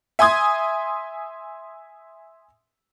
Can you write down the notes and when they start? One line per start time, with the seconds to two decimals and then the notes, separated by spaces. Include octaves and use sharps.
0.19 E5 G#5 C6 D#6 G#6